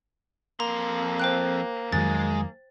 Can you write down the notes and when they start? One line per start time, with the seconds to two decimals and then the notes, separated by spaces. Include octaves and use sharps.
0.60 F2 A#3 A#5 C6
1.20 C5 G5 F#6
1.92 F2 D#3 F#3 G#3 A6